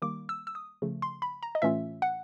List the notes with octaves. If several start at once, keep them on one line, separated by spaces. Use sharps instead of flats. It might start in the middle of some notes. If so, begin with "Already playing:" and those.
D#3 G3 A#3 D6
E6
E6
D#6
C#3 F3 A3
C6
B5
A#5
D#5
A2 E3 A3 C#4 F4 E5
F#5